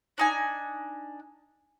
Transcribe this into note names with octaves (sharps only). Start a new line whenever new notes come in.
D4 D#4 G#5